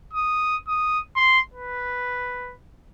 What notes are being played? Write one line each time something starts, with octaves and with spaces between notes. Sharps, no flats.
D#6
D#6
C6
B4